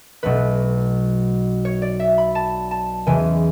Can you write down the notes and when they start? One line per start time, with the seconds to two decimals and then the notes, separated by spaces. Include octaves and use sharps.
0.23 B1 B2 F#3 A3 B4
1.65 C#5
1.82 D5
2.00 E5
2.18 B5
2.35 A5
2.71 A5
3.06 E2 C#3 E3 G#3 G#5